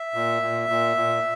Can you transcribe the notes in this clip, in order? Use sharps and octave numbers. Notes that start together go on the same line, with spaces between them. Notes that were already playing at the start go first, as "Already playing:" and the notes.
Already playing: E5
A#2
A#2
A#2
A#2